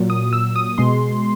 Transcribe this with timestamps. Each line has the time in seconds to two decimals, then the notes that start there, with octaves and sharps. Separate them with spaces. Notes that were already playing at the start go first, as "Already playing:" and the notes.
Already playing: A#2 F#3
0.10 D#6
0.33 E6
0.56 D#6
0.78 B2 G#3 C6